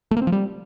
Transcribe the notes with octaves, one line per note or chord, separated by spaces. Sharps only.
A3
A#3
C4
F3
G3